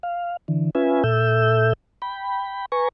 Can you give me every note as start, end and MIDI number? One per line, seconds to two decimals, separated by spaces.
0.03 0.37 77
0.48 0.70 50
0.48 0.70 52
0.75 1.03 61
0.75 1.03 65
0.75 1.03 71
0.75 1.03 76
0.75 1.03 80
1.04 1.73 46
1.04 1.73 69
1.04 1.73 76
1.04 1.73 88
1.04 1.73 91
2.02 2.65 79
2.02 2.65 83
2.72 2.88 71
2.72 2.88 80
2.72 2.88 82
2.72 2.88 85